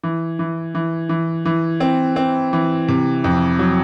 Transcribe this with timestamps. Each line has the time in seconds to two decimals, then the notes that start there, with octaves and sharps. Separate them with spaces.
0.03 E3
0.39 E3
0.75 E3
1.09 E3
1.45 E3
1.80 C4
2.16 C4
2.53 E3
2.89 C3
3.24 F2
3.59 F#3